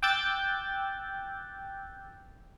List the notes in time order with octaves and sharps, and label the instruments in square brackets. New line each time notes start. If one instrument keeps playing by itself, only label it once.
[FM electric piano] G5 D6 E6 F#6 G6 A6